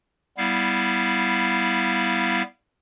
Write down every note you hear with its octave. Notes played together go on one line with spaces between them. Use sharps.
G3 B3 E4 F5